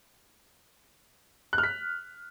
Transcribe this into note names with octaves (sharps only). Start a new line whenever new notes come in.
F#6
F6
B6